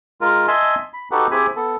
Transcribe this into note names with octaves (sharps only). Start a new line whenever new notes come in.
G#3 F4 A#4
D#5 E5 G#5 A5 C6
B5
D#4 F#4 G4 A4 B4 F#5
C4 E4 G4 G#4 G#5 B5
B3 A4